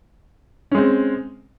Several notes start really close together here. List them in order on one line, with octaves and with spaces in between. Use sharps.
C#4 G#3 C4